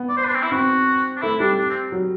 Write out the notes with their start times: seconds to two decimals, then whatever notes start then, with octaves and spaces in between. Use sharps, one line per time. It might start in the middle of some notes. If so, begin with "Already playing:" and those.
Already playing: B3
0.09 D5
0.17 C5
0.26 D4
0.35 C4
0.43 E4
0.52 C4 F#4
1.17 D4
1.22 A3 E4
1.40 G3 D4
1.58 D4
1.70 C4
1.92 F#3